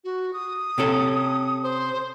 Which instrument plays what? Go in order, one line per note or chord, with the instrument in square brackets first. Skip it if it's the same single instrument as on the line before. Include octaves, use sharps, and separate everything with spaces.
[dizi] F#4
D#6
[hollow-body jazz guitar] C3 C#4 A4
[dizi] C5